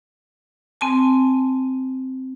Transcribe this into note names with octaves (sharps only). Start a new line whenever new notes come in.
C4 G#5 A5